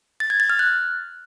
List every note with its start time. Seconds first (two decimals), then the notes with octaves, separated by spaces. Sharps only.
0.20 A6
0.30 G#6
0.40 A6
0.50 F6
0.59 F#6